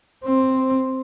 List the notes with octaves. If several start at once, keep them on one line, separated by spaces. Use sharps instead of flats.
C4